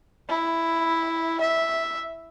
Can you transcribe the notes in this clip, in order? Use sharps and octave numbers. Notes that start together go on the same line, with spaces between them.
E4
E5